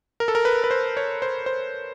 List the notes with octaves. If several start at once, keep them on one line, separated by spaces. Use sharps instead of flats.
A#4
A4
A#4
B4
B4
C5
C#5
C5
C5